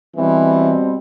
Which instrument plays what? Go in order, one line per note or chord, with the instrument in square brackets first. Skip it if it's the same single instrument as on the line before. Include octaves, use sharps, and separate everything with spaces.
[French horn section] B2 G3 C4 [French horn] E3